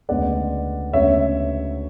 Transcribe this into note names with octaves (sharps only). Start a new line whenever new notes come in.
D2 C#3 G#3 B3 D5 F#5
D2 C#3 G#3 B3 C#5 E5